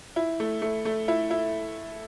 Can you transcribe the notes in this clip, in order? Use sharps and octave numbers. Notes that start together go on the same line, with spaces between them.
E4
A3
A3
A3
E4
E4